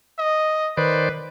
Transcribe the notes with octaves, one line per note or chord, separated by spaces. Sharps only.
D#5
D#3 B4 C5 D5